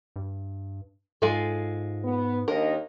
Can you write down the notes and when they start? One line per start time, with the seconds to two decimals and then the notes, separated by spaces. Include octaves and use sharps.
0.16 G2
1.22 G#2 G#3 F4 A4
2.05 B3
2.48 D#2 D#3 D4 A#4 D#5